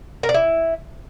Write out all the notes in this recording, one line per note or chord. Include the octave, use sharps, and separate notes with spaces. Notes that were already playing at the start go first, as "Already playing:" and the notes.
A#4
D5
E4